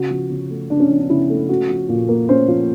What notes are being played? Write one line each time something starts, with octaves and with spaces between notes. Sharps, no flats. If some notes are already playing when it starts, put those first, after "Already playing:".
Already playing: C#3 F#4
F3
C#3
A3
C#3 D4
C#4
F3 D4
D4
C#3 E4
A3
C#4 F#4
F3
A#2
A#3
C#4 C5
F3